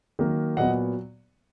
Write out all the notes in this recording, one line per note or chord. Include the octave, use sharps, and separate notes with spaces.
D#3 F#3 A#3
A#2 F#3 B3 D#5 F#5